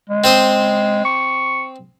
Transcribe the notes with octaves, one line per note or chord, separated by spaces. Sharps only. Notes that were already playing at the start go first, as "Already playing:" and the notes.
G#3
C4 C5 D#6
C#6